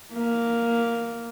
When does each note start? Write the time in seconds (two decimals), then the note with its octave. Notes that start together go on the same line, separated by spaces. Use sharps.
0.13 A#3